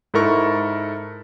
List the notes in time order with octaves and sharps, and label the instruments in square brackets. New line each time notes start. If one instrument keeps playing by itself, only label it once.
[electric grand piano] G#2 E4 A4 A#4 C#6